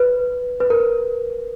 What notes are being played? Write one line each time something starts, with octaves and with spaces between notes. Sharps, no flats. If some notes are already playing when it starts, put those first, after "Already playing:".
Already playing: B4
B4
A#4